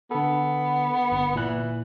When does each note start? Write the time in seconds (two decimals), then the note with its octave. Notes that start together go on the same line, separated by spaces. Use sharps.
0.11 D3 B3 A4
1.12 G1
1.36 A#2 E3 F#6